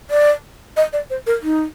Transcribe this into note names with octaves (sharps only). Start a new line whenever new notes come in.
D5
D#5
D5
C5
A#4
D#4